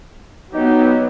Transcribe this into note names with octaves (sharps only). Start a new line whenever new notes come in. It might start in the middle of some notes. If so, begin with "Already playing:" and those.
F#3 B3 D#4 G4